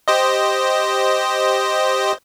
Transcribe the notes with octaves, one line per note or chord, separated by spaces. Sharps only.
G4 C5 D#5